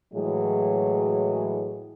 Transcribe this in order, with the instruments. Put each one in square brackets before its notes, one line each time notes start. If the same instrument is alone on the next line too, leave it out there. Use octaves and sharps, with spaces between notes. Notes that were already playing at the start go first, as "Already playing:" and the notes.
[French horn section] A2 E3 F#3 G#3 G#4